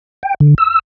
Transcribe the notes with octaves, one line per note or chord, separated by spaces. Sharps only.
G5
D3
E6